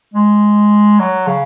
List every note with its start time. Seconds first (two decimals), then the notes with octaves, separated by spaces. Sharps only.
0.14 G#3
1.00 F#3
1.27 C#3